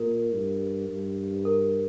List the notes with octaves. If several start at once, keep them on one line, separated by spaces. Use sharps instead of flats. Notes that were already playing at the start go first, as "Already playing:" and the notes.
Already playing: A#2 A#4
G2
G2
A#4